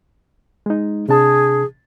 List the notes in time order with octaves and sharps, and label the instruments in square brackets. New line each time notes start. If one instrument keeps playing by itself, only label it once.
[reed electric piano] G#3 D#4
[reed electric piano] C3 D4 A5 [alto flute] G#4